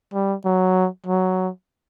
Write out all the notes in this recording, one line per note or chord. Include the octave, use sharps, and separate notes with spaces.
G3
F#3
F#3